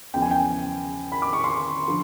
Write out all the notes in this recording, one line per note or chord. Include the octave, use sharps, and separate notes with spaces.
E2 C#3 F3 G5
G#5
G5
B5
D6
C#6
C6
D3 F3